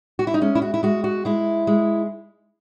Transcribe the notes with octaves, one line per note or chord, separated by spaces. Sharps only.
F#4
E4
D#4
G#3 C#4
E4
F#4
E4
G#3 F#4
F#4
G#3 E4
G#3